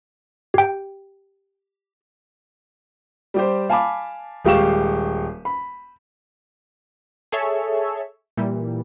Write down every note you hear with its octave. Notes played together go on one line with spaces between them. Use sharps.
G4 G5
G3 G4 C5
F5 G#5 A5 B5 D6
D#1 G#3 G4 F5 C#6 E7
B5
G#4 A4 C#5 E5
A#2 E3 G3